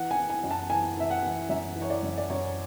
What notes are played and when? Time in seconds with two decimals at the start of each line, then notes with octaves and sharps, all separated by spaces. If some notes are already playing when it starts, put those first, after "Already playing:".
Already playing: E3 F#5
0.11 G#5
0.16 E3
0.30 G#5
0.44 F#2
0.51 A5
0.70 E3 G#5
0.97 E3 E5
1.10 F#5
1.23 E3
1.49 F#2 E5
1.76 E3
1.82 C#5
1.90 D5
2.03 F#2
2.18 D5
2.30 F#2 C#5